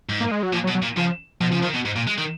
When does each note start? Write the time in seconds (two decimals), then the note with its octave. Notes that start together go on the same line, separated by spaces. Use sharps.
0.09 G#2
0.21 A#3
0.31 G#3
0.43 F#3
0.53 A#2 F3
0.64 F#3
0.68 B2
0.75 F#3
0.83 A#2
0.97 C#3 F3
1.41 B2 F3
1.52 C#3
1.62 D#3
1.74 B2
1.85 G#2
1.96 A#2
2.07 G#3
2.18 D#3